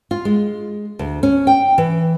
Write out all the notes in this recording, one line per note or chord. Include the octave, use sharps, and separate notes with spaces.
F4
G#3
D2
C#4
G5
E3